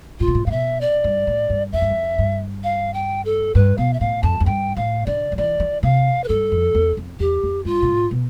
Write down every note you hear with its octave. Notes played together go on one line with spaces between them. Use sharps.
A2 F4
B2
A2
A2 F5
B2 E5
D5
G2
A2
G2
F2 E5
G2
F2
G2
F5
G5
A4
G2 B4
B2 F5
E5
A2 F5
F2 A5
F2
G2 G5
A2 F5
D3 D5
F3
E3 D5
E3
C3 F5
B4
G2 A4
F2
E2
F2
E2 G4
F2
G2 F4
B2
A2
B2